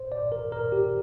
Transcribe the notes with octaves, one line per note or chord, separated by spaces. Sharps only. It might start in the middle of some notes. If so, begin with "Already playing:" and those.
Already playing: C5
D5
A#4
A#4
G4